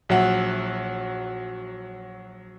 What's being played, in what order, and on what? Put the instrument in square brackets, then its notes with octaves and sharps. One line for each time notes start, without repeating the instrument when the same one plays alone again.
[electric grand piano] A#1 F#3 E5 F#5